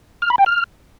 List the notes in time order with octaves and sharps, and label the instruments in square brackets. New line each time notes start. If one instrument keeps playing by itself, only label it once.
[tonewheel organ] F6
B5
G5
F6